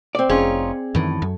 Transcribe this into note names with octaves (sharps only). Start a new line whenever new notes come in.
C4 D5
F1 C#4 D#4 F4 G#4
F#2 A2 D#3 E3
F#2